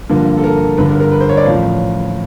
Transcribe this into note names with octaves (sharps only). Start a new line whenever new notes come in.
G2 D3 F3 A#3
A4
A#4
G1 G2 D3 B4
A#4
A#4
B4
C5
C#5
D5
A1 A2 F3 F5